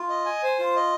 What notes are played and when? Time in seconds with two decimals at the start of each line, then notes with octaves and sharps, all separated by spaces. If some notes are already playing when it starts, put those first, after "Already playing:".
Already playing: F4
0.09 D#5
0.25 G#5
0.43 C5
0.59 F4
0.76 D#5